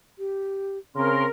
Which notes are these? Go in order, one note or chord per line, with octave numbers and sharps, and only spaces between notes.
G4
C#3 C4 A#4 C6